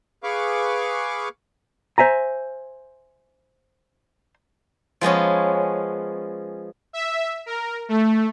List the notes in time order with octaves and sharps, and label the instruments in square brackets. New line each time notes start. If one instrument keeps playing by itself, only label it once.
[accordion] G#4 B4 F5 C#6 D6
[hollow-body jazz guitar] C5 E5 G#5 A#5
[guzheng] F3 G#3 B3 C#4
[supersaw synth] E5
A#4
A3